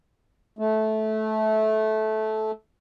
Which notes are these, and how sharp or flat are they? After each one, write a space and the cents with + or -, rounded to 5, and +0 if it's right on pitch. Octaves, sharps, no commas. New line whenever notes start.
A3 -15